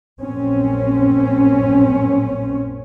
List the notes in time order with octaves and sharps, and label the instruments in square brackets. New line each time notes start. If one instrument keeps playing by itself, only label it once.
[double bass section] A#1 F#2 C4 C#4